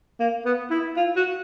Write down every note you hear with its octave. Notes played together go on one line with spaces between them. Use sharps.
A#3
B3
E4
F4
F#4